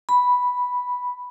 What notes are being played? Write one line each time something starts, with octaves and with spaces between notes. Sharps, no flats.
B5